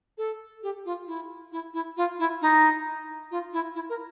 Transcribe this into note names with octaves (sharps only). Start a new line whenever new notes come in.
A4
G4
F4
E4
E4
E4
F4
E4
D#4
F4
E4
E4
A#4